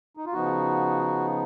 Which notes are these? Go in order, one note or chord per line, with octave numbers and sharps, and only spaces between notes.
D#4
F4
C#3 F3 B3 D#4 F#4